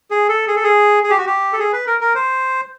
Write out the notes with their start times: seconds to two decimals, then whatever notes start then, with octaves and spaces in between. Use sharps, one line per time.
0.11 G#4
0.29 A4
0.48 G#4
0.56 A4
0.64 G#4
1.03 G#4
1.10 G4
1.18 F#4
1.26 G4
1.53 A4
1.59 G#4
1.73 B4
1.87 A#4
2.01 A#4
2.15 C5